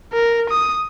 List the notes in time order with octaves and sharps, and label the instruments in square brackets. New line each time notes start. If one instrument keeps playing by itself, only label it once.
[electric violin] A#4
D#6